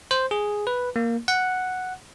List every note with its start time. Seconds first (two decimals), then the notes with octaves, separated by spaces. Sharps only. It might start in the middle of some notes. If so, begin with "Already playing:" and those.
0.11 C5
0.31 G#4
0.67 B4
0.96 A#3
1.28 F#5